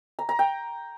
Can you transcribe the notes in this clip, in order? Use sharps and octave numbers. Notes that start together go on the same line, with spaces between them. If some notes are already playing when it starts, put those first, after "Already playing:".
A#5
A#5
G5